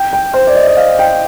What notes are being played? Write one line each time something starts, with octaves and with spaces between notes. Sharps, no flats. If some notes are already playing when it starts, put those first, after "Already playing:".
Already playing: G5
G5
C5
D5
D#5
D#5
F5
G5